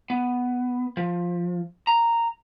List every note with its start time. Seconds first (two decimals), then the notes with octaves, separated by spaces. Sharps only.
0.10 B3
0.97 F3
1.87 A#5